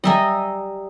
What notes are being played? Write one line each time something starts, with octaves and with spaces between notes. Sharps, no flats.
G3 D#5 E5 G#5 A#5